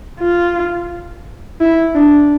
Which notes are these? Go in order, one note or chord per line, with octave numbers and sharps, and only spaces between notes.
F4
E4
D4